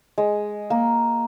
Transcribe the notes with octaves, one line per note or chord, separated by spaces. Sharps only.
G#3
A#3